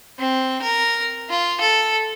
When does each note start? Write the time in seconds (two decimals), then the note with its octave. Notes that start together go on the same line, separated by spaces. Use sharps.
0.19 C4
0.62 A#4
1.30 F4
1.61 A4